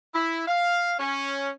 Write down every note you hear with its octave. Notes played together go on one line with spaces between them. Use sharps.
E4
F5
C#4